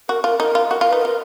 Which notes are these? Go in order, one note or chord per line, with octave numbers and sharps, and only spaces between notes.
F#4 A#4
F4 A#4
D#4 A#4
F4
F#4 A#4
F4 A#4
D#4 B4
F4 A#4